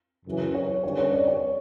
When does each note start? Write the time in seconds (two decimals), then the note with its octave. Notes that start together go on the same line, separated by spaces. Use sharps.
0.26 F#2 C#3 E3
0.55 C#5
0.83 D3 G3 C#4 C#5
0.98 C#5
1.13 D5
1.28 C#5